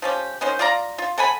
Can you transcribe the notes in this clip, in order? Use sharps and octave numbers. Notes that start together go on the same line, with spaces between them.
F3 C#4 G4
D#3 C#4 F#4 C5
F4 D5 F5 A#5
F4
A4 F#5 G#5 B5